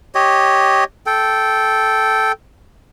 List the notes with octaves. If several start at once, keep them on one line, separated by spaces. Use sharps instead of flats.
G4 C#5 D#5
A4 G5